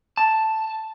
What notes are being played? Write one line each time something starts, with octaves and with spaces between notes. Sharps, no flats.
A5